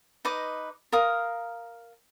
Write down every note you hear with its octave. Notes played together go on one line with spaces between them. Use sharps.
D#4 B4 D#5 D6
A#4 F5 D#6